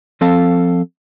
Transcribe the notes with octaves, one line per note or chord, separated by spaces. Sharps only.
F3 C4 A4 F5 A5